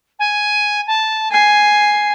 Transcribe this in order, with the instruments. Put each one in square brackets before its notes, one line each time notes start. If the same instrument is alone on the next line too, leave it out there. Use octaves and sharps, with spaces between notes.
[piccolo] G#5
A5
[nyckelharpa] G#5 [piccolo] C7